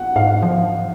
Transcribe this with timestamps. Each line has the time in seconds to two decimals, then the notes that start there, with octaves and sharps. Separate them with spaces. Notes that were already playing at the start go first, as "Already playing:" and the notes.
Already playing: F#5
0.16 G#2 F5
0.43 F3